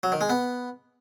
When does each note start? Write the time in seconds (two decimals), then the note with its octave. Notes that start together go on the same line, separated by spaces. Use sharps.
0.03 F#3
0.12 D#3
0.21 G#3
0.29 B3